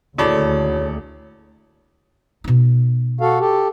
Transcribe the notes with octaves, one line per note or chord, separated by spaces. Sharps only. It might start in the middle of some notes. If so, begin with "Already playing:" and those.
D#1 D2 E4 F#4 G#4 A4 C#5 D5
B2 D#4
F#4 A4 F5
G4 A4